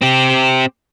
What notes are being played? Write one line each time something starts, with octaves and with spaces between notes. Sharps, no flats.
C4 G4